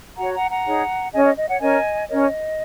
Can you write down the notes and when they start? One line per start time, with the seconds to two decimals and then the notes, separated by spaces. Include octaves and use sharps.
0.18 F#4 C#5 F#5 A#5
0.33 F#5 A#5
0.50 F#5 A#5
0.66 D#4 G#4 C#5
1.13 C#4 G#4 C#5 D#5 G#5
1.25 D#5
1.37 D#5
1.49 C#5 F#5
1.61 C#4 A#4 C#5 D#5 G#5
2.08 C#4 A#4 C#5 D#5